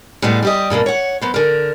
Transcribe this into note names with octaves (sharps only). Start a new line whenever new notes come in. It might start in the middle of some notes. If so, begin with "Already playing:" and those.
A2 G3 G#3 B3
G3 G4 D#5
G2 B2 A#3 D4
C#5 F#5
F#3 B3 C5
D3 A#4